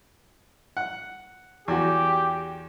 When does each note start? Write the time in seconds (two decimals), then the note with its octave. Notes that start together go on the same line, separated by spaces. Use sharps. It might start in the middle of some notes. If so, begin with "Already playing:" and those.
0.77 F#5
1.68 E2 F#4 G4